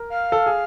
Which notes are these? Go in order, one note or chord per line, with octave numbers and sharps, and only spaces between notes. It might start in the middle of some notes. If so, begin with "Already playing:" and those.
Already playing: A#4
F5
A4
G#4